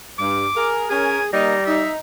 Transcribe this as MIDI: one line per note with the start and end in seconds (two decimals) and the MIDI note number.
0.19 0.46 43
0.19 0.69 86
0.55 0.87 68
0.55 0.87 70
0.90 1.18 61
0.90 1.32 68
0.90 1.18 70
0.90 1.26 80
1.33 1.87 55
1.33 1.53 58
1.33 1.53 63
1.33 1.62 82
1.66 1.96 63
1.66 1.90 76